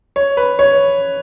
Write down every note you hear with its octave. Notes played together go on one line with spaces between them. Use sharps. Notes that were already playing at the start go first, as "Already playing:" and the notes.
C#5
B4
C#5